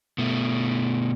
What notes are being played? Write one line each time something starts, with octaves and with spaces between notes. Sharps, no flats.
B2 A3